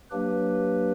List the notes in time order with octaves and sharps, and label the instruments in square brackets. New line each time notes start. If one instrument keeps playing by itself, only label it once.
[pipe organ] F#3 A#3 D4 G4 B4